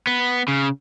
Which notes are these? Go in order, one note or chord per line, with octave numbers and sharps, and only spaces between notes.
B3
C#3